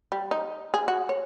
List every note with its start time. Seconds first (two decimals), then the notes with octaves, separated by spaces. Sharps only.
0.12 G3
0.31 D#4
0.74 G#4
0.88 F#4
1.09 C#5